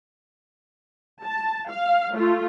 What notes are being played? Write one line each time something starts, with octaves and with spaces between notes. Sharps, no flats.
A5
F5
A3 F4